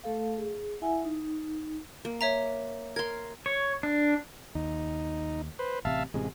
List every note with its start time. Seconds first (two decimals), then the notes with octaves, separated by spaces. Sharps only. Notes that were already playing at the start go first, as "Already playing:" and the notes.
0.04 A3 A4 F5
0.38 G#4
0.82 E4 E5 F#5 G#5
1.05 D#4
2.05 A#3
2.21 C#5 E5 A#5
2.96 A#4 C6 G#6
3.46 C#5
3.83 D4
4.55 D#2 D#4
5.59 B4 C5
5.85 A1 C3 E5 F5 A5
6.14 A1 A2 C3 G#3